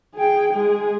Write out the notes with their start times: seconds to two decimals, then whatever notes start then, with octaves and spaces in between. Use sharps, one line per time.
0.15 G#4 G5
0.53 G#3 G#4